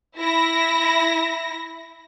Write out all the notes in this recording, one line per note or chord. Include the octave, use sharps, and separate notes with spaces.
E4 A#6